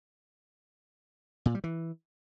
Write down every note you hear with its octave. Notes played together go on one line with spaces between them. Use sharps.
A#2
G3
E3